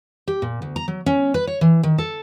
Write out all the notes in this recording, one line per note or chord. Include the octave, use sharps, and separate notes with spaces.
G4
A#2
D2
A#5
F#3
C#4
B4
C#5
E3
D#3
A4